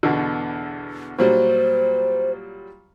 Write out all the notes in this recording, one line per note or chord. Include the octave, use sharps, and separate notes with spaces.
E2 B2 D3
A#2 F#3 G3 C5